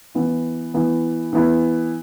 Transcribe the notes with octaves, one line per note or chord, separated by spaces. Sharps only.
E3 B3 E4
E3 B3 E4
E3 B3 E4